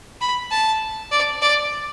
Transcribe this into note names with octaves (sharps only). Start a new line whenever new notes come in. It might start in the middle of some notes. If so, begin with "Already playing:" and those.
B5
A5
D5
D5